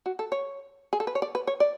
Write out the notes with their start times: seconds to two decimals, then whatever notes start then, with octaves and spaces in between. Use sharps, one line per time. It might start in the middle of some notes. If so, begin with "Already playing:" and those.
0.06 F#4
0.19 A4
0.32 C#5
0.93 G#4
1.00 A4
1.07 B4
1.15 C#5
1.22 D5
1.35 B4
1.47 C#5
1.60 D5